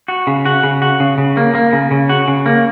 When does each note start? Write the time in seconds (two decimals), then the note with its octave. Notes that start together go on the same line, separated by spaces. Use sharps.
0.08 F#4
0.27 C#3
0.45 F#4
0.63 C#3
0.82 F#4
1.00 C#3
1.18 C#3
1.37 A#3
1.55 A#3
1.73 C#3
1.91 C#3
2.09 F#4
2.28 C#3
2.46 A#3